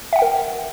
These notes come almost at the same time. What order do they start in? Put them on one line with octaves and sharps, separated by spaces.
E5 F#5 G5 A#4